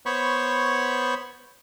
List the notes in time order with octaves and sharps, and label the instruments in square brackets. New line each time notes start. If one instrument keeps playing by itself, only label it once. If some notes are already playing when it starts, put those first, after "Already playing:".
[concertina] B3 C5 C#5 B5 C#6